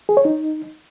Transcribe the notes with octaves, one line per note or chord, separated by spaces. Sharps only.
G#4
C#5
D#4